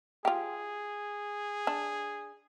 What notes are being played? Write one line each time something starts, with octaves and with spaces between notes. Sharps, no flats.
F4 G4 G#4
D4